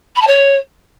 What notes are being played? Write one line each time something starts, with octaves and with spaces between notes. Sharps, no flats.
B5
A5
C#5